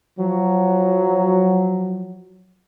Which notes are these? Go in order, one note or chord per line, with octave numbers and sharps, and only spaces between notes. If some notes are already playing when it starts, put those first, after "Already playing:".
F3 F#3